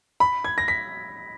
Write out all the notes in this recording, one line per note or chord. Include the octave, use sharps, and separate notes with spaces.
B5
G#6
A#6
B6